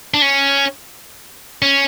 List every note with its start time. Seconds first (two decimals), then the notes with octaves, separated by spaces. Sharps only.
0.14 D4
0.22 C#4
1.62 C#4